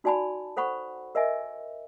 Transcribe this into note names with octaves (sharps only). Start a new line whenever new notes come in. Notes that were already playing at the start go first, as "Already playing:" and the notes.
D#4 F#4 D5 G#5 A5 B5
A4 C5 F#5 B5 C#6
A#4 D#5 E5 G#5